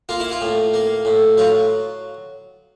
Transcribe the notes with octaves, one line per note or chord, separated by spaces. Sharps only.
A#3 F4
E4
F4
A2
A#3
A2
F#3 F4